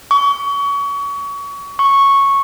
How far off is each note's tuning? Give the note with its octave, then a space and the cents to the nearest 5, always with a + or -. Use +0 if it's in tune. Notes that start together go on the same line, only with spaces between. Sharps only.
C#6 +30
C#6 -5